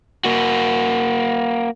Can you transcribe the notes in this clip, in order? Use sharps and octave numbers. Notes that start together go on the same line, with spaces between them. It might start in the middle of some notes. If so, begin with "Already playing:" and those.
A#3 F#4